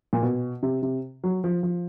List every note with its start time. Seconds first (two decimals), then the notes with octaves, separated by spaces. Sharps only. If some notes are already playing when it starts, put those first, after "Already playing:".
0.13 A#2
0.22 B2
0.63 C3
0.82 C3
1.24 F#3
1.44 F3
1.63 F3